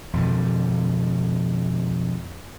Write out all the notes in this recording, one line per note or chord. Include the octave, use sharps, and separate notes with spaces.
F2 B2 D3